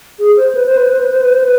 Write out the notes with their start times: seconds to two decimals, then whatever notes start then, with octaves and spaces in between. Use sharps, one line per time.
0.19 G#4
0.37 C5
0.55 B4
0.66 C5
0.77 B4
0.88 C5
0.99 B4
1.10 C5
1.21 B4
1.33 C5
1.44 B4